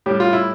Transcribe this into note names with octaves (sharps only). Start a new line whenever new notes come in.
A2 G3 G4
F4
E4